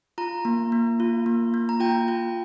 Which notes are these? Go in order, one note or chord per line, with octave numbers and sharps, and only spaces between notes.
F4 A#5
A#3
A#3
F4
A#3
A#3
A#5
F4 G5
F4